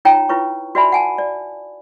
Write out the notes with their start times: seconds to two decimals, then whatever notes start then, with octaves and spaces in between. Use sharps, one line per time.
0.05 D#4 F4 C#5 G5 A#5
0.29 E4 F4 B4 C#5 C#6
0.75 F#4 B4 D5 E5 G#5 B5
0.92 F#5 G#5 A5
1.18 D5